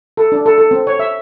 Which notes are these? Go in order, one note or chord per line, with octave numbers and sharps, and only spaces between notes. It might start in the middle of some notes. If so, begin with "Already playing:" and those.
A4
D4
A4
A4
C4
C#5
E5